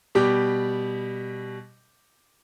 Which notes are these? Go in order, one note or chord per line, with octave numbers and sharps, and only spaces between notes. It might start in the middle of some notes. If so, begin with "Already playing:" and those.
B2 G3 G4 D6